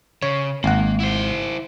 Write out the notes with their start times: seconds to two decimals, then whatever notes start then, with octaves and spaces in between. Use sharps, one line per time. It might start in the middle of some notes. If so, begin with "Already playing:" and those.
0.22 C#3 C#5
0.64 G#1 A#3 F#5
1.00 E4 C5